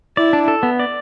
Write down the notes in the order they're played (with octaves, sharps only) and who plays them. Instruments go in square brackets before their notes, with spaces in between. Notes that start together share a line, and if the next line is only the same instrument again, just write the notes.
[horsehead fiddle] E4 [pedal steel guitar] D5
[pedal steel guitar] D4
A4
B3
D5